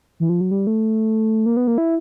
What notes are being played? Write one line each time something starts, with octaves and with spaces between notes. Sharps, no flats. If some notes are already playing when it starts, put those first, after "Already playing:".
E3
F3
F#3
G3
A3
A#3
B3
A#3
E4